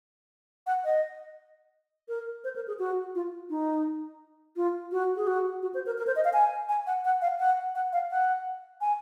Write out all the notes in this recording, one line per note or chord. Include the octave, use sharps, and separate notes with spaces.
F#5
D#5
A#4
C5
A#4
G#4
F#4
F4
D#4
F4
F#4
G#4
F#4
F#4
C5
A#4
A#4
C5
D#5
F5
G#5
G#5
F#5
F#5
F5
F#5
F#5
F5
F#5
G#5